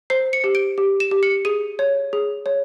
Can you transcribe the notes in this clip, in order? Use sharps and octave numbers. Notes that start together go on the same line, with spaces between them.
C5 C7
C#7
G4
D7
G4
E7
G4
C#7
G#4 D#7
C#5
G#4
C#5